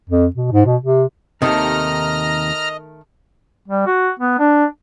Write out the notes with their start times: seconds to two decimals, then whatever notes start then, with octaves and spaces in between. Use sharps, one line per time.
0.10 F2
0.36 B2
0.52 G#2
0.66 B2
0.82 C3
1.42 D#2 A2 C3 D#3 A3 D#5 A#5 F6
3.68 G3
3.87 F#4
4.19 B3
4.39 D4